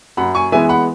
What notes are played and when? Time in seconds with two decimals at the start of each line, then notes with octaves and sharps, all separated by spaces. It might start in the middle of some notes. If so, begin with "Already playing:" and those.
0.17 F#2 F#5 B5
0.35 G#5 C#6
0.52 E3 G#3 B3 E5 G#5
0.69 F#5 B5